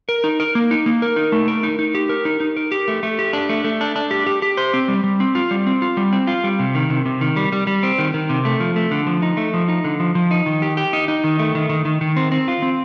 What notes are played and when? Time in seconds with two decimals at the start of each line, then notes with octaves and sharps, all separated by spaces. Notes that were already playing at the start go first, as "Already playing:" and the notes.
0.09 A#4
0.24 D#4
0.40 A#4
0.55 A#3
0.71 D#4
0.86 A#3
1.02 A#4
1.16 D#4
1.32 A3
1.48 A#4
1.63 D#4
1.79 D#4
1.95 G4
2.09 A#4
2.25 D#4
2.40 D#4
2.57 A#4
2.72 G4
2.88 A3
3.03 A3
3.19 G4
3.33 D4
3.49 A3
3.64 A3
3.81 D4
3.96 D4
4.11 G4
4.26 G4
4.42 G4
4.57 C5
4.74 C4
4.88 G3
5.04 G3
5.20 C4
5.35 F4
5.51 G3
5.67 C4
5.82 F4
5.97 G3
6.13 C4
6.27 F4
6.44 G3
6.59 C3
6.75 D#3
6.90 C3
7.06 C3
7.21 D#3
7.36 G3
7.52 G3
7.67 G3
7.83 C4
7.99 D#3
8.14 D#3
8.29 C3
8.45 A3
8.60 F3
8.76 A3
8.91 D3
9.07 F3
9.22 D#4
9.37 A3
9.54 F3
9.69 D#4
9.84 D3
10.00 F3
10.15 F3
10.31 D#4
10.46 D#3
10.62 G4
10.77 G4
10.93 D#4
11.08 D#4
11.24 D#3
11.39 A3
11.55 D#3
11.69 D#3
11.85 D#3
12.01 D#3
12.16 C4
12.32 C4
12.48 F4
12.62 C4